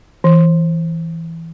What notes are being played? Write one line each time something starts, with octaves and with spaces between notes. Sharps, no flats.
E3